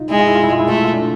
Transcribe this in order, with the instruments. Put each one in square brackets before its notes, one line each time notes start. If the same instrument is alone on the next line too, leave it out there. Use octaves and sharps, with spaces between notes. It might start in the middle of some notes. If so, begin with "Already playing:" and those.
Already playing: [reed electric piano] D#4 F4
[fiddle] G#3 [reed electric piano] E4
[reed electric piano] F4
E4
F4
E4
F4
E4
[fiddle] A3 [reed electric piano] F4
[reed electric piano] E4
F4
D4 E4